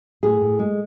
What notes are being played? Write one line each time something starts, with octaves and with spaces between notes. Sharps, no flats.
A2 G#4
A2
G#3